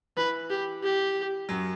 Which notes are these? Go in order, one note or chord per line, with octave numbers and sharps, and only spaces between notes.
E3 B4
G4
G4
F#2 F#3